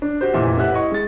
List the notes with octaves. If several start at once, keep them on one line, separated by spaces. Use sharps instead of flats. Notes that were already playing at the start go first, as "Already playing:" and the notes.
D4
F#4 G4 C5
F1 A#2 E3 E5
A2 G4 B4 E5 F#5 F#6
E4 D#5 C#6
G#3 A6